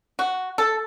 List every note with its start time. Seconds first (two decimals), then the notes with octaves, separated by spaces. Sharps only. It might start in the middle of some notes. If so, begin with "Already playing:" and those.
0.19 F#4
0.58 A4